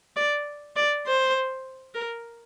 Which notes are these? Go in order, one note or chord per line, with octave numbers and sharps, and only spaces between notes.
D5
D5
C5
A#4